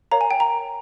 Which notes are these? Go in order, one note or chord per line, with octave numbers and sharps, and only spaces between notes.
A#4 C#5 F5 A#5
G#5
G5
A#5